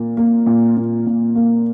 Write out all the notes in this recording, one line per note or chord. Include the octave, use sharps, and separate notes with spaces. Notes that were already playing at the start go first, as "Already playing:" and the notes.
Already playing: A#2 A#3
A#3
A#2
A#2
A#2
A#3